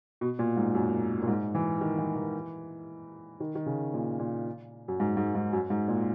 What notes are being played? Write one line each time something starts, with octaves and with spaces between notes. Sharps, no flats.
B2
A#2
G#2
F#2
A#2
G#2
E3
D#3
E3
E3
D#3
D#3
C#3
A#2
A#2
F#2
G#2
G#2
G#2
F#2
G#2
A#2